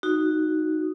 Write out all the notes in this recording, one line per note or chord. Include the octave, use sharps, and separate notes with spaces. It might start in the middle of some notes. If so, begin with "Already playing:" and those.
D#4 F#4